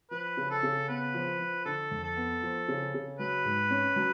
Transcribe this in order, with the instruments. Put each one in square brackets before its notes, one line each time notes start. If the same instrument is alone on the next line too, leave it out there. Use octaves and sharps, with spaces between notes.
[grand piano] F3 [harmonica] B4
[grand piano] C#3
[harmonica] A4
[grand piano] C#3
[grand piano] B3 [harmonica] B4
[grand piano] F3
F3
[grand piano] D3 [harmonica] A4
[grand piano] F2
[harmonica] A4
[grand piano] B3
F3
C#3
C#3
[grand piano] F#3 [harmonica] B4
[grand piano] G#2
C#4
F#3